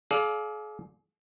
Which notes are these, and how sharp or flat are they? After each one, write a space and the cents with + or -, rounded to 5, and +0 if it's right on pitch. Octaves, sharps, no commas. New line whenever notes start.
G#4 +40 D5 +0 F5 +0